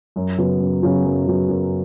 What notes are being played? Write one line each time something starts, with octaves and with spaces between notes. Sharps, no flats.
F#2
C#3 F#3 B3
F#2
C#3 F#3 B3
F#2
C#3 F#3 B3
F#2